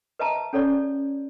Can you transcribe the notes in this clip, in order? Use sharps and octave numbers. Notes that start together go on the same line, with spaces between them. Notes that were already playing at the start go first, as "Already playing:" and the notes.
B4 D#5 E5 A5 A#5
C#4 A4 C#5 D5